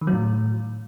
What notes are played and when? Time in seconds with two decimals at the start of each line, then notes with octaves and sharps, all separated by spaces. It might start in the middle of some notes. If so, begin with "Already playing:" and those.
0.01 D#3
0.07 F#3
0.13 A2